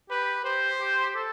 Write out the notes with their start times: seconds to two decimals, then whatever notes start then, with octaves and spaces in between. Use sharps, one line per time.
0.10 G4 B4
0.45 G4 C5
0.80 G4
1.05 G4
1.16 A4